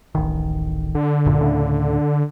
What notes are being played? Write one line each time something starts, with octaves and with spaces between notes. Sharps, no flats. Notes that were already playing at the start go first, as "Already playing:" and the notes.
D1 A1 D#3
D3
G1 F#2 A#2
D2 A2 C#3